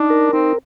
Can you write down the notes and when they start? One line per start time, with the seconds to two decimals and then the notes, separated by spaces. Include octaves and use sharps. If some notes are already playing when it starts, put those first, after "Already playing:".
Already playing: D4 D#4
0.10 A#4
0.33 C4 D#4